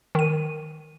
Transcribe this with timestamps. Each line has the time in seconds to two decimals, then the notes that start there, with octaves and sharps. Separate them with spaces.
0.15 D#3 D#7